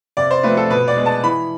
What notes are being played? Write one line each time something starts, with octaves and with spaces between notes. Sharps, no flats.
C3 D5
C5
F3 A3 C4 B4
A4
B2 B4
D5
G#3 B3
A5
E3 B5